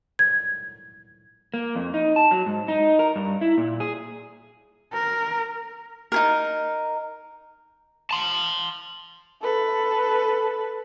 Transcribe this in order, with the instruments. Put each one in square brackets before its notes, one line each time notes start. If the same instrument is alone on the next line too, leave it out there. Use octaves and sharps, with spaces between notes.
[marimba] G#6
[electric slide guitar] A#3
F2
D#4
A5
F#3
G#2
D#4
A#4
G2
E4
A#2
G#4
[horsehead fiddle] A#4
[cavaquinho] D#4 G#4 A#4
[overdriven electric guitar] A5 C6
[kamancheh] A4 B4